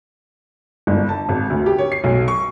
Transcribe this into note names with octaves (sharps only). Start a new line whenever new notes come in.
G1
A5
G#1
D2
G4
C#5
C7
B1
C#6